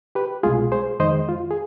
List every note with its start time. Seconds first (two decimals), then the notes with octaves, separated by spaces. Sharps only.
0.15 G4 B4
0.43 C2 B2 G#3 F4 G#4
0.72 G#4 C5
1.00 F2 D#3 G#3 C5 D#5
1.29 F4
1.51 G#4